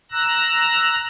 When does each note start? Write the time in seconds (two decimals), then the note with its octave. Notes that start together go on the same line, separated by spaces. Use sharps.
0.12 A#5 E6 F#6 A#6